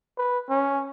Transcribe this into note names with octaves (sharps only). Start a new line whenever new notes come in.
B4
C#4